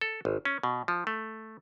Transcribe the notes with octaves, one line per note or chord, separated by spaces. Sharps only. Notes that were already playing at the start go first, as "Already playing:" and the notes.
A4
G#1
C#4
B2
F3
A3